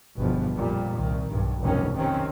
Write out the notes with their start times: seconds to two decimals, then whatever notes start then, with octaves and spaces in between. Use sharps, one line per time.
0.18 G1 E2 B2 F3
0.55 A#1 F2 A#2 G3
0.96 C2 D#3
1.31 B1 G2
1.61 F1 B1 G2 C3 D#3 C#4
1.96 F1 C3 D#3 C4 C#4